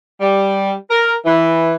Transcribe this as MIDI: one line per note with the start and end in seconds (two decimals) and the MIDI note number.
0.21 0.73 55
0.90 1.14 70
1.26 1.74 52